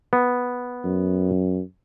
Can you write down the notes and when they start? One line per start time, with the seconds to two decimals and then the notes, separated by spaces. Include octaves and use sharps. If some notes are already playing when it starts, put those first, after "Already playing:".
0.13 B3
0.85 F#2